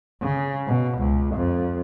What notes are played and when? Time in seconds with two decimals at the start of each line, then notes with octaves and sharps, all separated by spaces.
0.22 C#3
0.67 B2
0.99 C#2
1.36 F2